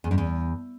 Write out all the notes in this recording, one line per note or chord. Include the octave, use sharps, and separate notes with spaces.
E2
F#2
E2